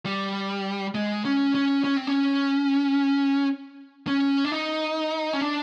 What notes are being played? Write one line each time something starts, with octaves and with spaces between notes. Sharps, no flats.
G3
G#3
C#4
C#4
C#4
C4
C#4
C#4
D4
D#4
C#4
D4